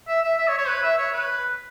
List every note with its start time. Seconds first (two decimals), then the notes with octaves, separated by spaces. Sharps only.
0.08 E5
0.22 E5
0.38 E5
0.48 C#5
0.58 C#5
0.68 B4
0.83 E5
0.98 C#5
1.13 B4